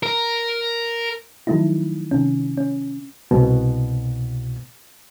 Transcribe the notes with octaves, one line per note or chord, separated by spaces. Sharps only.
A#4
D#3 F3 F#3 A3 D#4 E4
C3 D#3 C#4
C#4
C2 B2